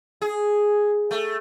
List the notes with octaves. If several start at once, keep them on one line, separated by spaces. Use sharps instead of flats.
G#4
A3